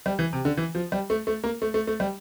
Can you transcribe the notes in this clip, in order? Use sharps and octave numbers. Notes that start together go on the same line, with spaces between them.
G3
E3
C3
D3
E3
F3
G3
A3
A3
A#3
A3
A3
A3
G3